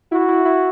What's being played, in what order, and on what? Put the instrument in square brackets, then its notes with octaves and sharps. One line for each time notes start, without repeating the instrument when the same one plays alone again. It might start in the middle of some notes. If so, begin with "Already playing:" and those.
[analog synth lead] E4 [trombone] F#4
[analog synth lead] E4
E4